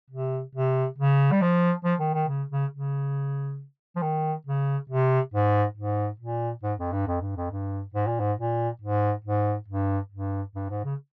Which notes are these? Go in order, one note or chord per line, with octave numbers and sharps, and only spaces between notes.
C3
C3
C#3
G3
F3
F3
D#3
D#3
C#3
C#3
C#3
F3
D#3
C#3
C3
G#2
G#2
A#2
G#2
F2
G2
F2
G2
F2
G2
G#2
A#2
G#2
A#2
G#2
G#2
G2
G2
G2
G#2
C#3